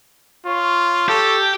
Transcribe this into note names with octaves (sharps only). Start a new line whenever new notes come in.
F4 C#5
G4 A4